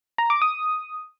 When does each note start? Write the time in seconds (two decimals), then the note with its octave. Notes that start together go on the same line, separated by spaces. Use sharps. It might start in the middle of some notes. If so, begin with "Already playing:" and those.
0.18 A#5
0.30 D6
0.42 D#6